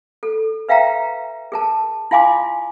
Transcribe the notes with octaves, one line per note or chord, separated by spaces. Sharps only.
A4
B4 E5 F5 G5 A#5
G#4 A#4 A5
E4 F4 F5 G#5 C6 D6